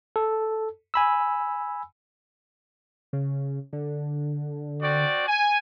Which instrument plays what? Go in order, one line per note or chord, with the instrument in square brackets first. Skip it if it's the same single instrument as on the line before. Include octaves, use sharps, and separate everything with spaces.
[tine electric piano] A4
G#5 B5 E6
[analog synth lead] C#3
D3
[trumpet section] C4 F#4 D5
G#5